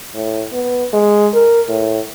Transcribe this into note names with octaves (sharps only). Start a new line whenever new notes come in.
A2
B3
G#3
A#4
A2